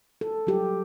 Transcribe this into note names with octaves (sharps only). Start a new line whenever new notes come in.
A4
F#3 G4